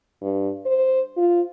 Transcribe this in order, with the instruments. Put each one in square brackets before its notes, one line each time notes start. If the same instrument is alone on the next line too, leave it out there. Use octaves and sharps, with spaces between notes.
[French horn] G2
C5
F4